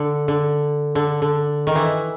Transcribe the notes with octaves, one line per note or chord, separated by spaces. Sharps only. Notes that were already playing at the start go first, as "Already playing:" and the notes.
Already playing: D3
D3
D3
D3
D#3
E3